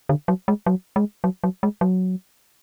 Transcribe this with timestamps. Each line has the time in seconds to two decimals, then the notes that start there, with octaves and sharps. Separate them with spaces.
0.09 D3
0.28 F#3
0.48 G#3
0.66 F#3
0.96 G#3
1.24 F#3
1.44 F#3
1.63 G#3
1.81 F#3